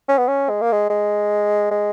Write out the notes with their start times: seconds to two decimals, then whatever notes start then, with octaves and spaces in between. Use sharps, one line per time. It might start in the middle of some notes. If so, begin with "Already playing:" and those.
0.09 C#4
0.18 B3
0.28 C#4
0.49 G#3
0.62 A#3
0.72 G#3
0.90 G#3
1.71 G#3